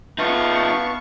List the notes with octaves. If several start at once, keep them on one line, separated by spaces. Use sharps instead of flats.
B3 D#4 F4 F5 A5 C#6